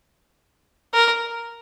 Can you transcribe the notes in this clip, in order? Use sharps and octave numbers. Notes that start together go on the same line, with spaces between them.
A#4